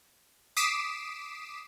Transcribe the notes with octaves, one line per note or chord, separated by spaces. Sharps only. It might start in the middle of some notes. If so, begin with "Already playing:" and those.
D6 D#6 B6 C7 D7 E7